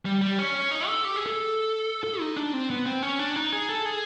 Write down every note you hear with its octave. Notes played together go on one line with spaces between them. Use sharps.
G3
G3
C#4
D#4
A4
G4
G#4
A4
A4
D#4
D4
C4
B3
C4
C#4
D4
D#4
G#4
A4
G#4